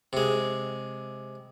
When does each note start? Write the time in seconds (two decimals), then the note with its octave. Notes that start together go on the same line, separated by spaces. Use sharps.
0.13 C3 G#3